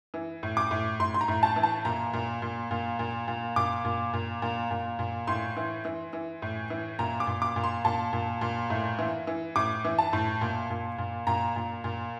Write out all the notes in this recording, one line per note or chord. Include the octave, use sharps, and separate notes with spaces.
E3
A2
D6
A2
A2 C6
C6
A#5
A2
A5
E3
A5
A#2 A#5
A#2
A#2
A#2
A#2
A#2
A#2 D6
A#2
A#2
A#2
A#2
A#2
A2 C6
E3
E3
E3
A2
E3
A#2 A#5
D6
A#2
D6
A#2
C6
A#2 A5
A#2
A#2
A2
E3
E3
A2 D6
E3
A5
A2
A#2
A#2
A#2
A#2 A#5
A#2
A#2